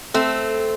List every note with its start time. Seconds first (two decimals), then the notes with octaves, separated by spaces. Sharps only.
0.14 A3 C4